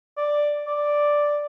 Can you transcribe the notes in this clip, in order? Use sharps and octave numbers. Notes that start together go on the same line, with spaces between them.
D5
D5